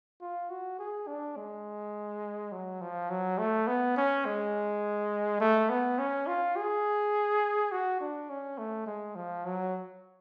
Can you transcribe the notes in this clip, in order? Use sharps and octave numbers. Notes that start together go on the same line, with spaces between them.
F4
F#4
G#4
D4
G#3
F#3
F3
F#3
A3
B3
C#4
G#3
A3
B3
C#4
F4
G#4
F#4
D4
C#4
A3
G#3
F3
F#3